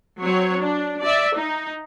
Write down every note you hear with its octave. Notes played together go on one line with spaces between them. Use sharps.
F#3 C4 C#5
D4
D5 E5
D#4